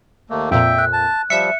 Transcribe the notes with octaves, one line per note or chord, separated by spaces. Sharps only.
D#2 A3 A#3
F2 A#2 E5 G5
F#6
A5
F3 G3 E5 C#7